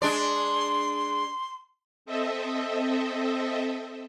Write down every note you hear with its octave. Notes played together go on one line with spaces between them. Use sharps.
G#3 D4 D5 C6
C4 A4 D#5 E5